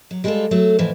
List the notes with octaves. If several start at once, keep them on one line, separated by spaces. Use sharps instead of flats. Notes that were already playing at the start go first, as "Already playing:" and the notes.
F#3
G3 G#3 C4 E4 F4 A4
F#3 A3 A4
F2 A2 E3 F3